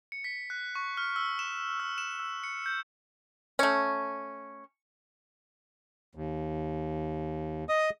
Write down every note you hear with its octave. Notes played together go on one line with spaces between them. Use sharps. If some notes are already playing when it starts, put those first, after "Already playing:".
C#7
B6
F#6
C#6
F6
E6
E7
E6
E7
E6
C#7
G6
A3 C#4
D#2
D#5 D#6